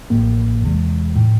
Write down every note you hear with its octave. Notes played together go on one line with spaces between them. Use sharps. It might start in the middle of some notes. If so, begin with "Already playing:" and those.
A1 A2 F3 A#3
E2 C3 E3 G#3
A2 F3